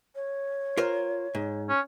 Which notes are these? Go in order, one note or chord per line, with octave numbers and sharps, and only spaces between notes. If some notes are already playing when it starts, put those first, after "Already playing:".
C#5
F4 A#4 C5
G#2
C#4